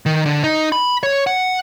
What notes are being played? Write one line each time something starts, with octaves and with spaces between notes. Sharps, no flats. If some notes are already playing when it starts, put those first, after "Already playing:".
D#3
D3
D#4
B5
C#5
F#5